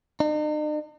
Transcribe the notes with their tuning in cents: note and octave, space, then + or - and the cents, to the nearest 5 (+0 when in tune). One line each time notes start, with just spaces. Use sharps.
D#4 -45